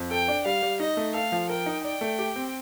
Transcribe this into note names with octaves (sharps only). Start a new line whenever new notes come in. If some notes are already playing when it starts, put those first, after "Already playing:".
Already playing: F2
A4 G5
D4
G3 F5
G3
D#4 D#5
A3
A4 F5
F3
A#4 G5
D#4
D5 G5
A3
G4
C4